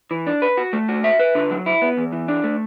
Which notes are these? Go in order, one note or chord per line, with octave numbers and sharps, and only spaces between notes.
E3
D4
B4
F#4
A3
F#4
E5
B4
D3
F#3
E4
B3
E2
E3
D4
A3